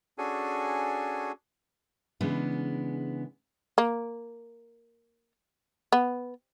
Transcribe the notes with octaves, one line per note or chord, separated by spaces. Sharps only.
C#4 D4 F#4 G#4 A4 G#5
C#3 E3 G#3 B3 D4
A#3
B3